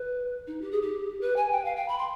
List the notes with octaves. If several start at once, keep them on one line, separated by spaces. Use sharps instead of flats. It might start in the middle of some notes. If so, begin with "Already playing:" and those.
Already playing: B4
D#4
G4
G#4
G4
B4
G#5
G5
F5
G5
B5
C6